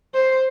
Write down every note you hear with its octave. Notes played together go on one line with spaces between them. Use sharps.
C5